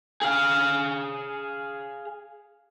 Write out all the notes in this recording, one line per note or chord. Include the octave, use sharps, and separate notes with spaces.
G#4 F5